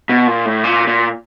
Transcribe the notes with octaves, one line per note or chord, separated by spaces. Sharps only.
B2
A#2
A2
A#2
A#2